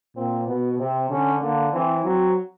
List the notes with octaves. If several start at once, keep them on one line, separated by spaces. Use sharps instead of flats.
A#2 C4
B2 B3
C3 C4
D3 C#4
D3 A#3
E3 C4
F#3 C4